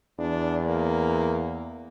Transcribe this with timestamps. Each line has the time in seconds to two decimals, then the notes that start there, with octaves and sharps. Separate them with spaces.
0.19 E2 D4
0.67 A#3